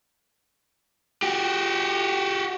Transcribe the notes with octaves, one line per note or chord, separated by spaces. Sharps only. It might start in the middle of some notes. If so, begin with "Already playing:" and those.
F#4 G4